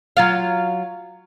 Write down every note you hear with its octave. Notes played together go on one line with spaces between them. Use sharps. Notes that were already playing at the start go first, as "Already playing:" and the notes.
F#3 F4 F5